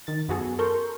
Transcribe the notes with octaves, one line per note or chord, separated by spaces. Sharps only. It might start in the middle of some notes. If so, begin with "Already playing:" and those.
D#3 A6
F#2 B3 F#4 G#4 A4
A4 A#4 C6 C#6 G6